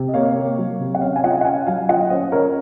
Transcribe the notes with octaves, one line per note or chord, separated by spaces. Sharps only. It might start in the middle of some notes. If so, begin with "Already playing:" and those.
Already playing: C3
D#5
A#3 C#5 F5
A#3
F#3
C3
F#5
C#4 C#5 F5
G#5
F4 D#5 F#5
F#5
C#4 F5 G#5
F#3 F5 G#5
F4 D#5 F#5
C#4 C5 D#5
D#5
C#4 A#4 C#5